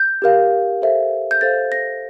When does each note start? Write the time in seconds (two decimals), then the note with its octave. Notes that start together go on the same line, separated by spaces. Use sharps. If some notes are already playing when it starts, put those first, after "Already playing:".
Already playing: G6
0.22 G4 A#4 F5
0.82 A4 C5 E5
1.31 G6
1.41 A4 C5 F5 A6
1.72 A#6